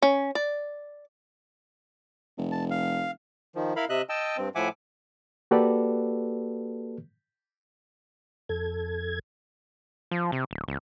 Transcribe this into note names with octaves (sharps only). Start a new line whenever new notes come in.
C#4
D5
F1
A5
F5
D#3 F3
E4 A#4 F5 B5
C3 D#5 E5 F#6
D#5 G5 A5 E6
G2 C4
A2 F3 E5 F#5 G#5 D6
A#3 F#4 G4 A4 B4 D5
F2 A4 G#6
F3
C3
D1
C#2